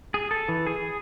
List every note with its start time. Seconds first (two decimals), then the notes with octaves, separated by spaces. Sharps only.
0.14 G#4
0.31 A4
0.49 E3
0.66 G#4